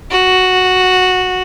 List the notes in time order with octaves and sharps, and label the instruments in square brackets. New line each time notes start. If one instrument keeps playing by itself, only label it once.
[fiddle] F#4